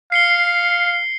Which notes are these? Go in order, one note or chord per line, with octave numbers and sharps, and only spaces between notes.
F5 C7 C#7 G7